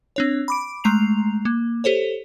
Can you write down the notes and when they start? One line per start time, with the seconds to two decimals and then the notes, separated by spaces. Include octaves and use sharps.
0.16 C4 D4 C#5
0.48 B5 D6 D7
0.84 G#3 A3 A#5 C7 F7
1.45 A#3
1.84 G4 A4 C5 C#5